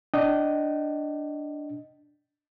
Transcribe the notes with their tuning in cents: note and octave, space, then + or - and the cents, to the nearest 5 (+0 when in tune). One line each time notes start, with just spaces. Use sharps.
D4 +0 D#5 +0 G5 -30